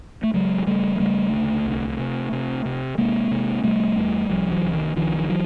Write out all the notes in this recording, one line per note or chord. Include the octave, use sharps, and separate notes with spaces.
A3
C#3 F#3 G#3
C#3 G3 A3
G#3
C#3 G3 A3
D2
C2
C3
C3
C3
C3 G#3 A#3
C3
C3 G3 A3
E2
C2 F3 G3
E3 F#3
C2
D#3
C2 D#3 F3
F3
E3 F#3